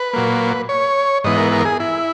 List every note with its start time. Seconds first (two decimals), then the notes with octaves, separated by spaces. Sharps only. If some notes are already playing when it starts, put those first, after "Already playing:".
Already playing: B4
0.13 A#2 F#3 A#3
0.69 C#5
1.24 G#2 E3 B3 D#5
1.37 A#4
1.52 A#4
1.65 G#4
1.80 E4